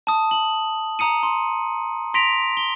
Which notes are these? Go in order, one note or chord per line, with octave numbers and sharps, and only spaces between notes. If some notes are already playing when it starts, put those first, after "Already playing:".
A5 D#6
F#7
A#5 D#6 C#7 D#7
C6
C6 A#6 B6 D7 F7
G7